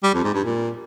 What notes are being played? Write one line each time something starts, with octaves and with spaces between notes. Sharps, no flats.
G3
F2
G#2
G2
A#2